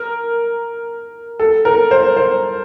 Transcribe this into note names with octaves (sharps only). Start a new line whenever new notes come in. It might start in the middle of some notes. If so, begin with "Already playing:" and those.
Already playing: A#4
A4
A#4
C5
C5